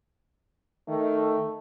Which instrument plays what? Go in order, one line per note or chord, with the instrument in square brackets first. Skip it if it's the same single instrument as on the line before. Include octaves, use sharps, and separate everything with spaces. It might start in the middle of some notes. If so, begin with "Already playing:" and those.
[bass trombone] D#3 [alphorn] A3